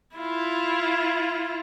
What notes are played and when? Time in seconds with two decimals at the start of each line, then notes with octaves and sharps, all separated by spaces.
0.16 E4 F4